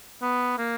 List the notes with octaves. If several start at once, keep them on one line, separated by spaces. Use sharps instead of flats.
B3
A#3